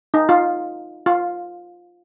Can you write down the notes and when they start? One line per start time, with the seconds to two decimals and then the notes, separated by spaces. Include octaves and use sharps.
0.14 D#4
0.29 F4
1.06 F4